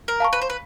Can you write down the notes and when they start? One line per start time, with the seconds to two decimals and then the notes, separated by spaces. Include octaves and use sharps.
0.08 A#4
0.20 F5 A5 C#6
0.33 B4
0.42 C5
0.50 B4